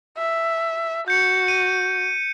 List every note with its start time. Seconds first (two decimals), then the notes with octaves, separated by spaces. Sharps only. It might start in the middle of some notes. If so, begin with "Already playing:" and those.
0.18 E5
1.08 F#4 G6 C#7
1.48 D#7